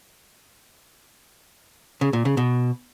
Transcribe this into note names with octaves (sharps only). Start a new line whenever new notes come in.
C#3
A#2
C#3
B2